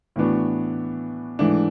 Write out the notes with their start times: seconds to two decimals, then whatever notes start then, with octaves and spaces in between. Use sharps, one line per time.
0.16 A2 E3 B3 D4 F#4
1.39 G#2 E3 A3 D4